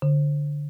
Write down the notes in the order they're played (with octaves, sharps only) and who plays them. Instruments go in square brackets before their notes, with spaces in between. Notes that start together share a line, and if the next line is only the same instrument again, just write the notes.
[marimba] D3